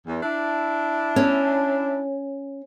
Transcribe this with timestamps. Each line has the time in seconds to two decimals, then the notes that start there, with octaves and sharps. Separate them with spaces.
0.07 E2
0.23 D4 E4
1.16 C#4